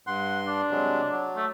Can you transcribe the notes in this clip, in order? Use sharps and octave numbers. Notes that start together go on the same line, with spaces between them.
G2 F#5 C6
D4
C3 F#3 G#3
F#3
A3